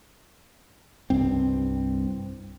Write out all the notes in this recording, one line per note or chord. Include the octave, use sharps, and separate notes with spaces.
C2 G2 C4